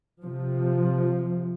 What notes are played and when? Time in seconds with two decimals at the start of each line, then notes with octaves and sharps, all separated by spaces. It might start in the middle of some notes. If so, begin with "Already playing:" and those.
0.22 C3 F3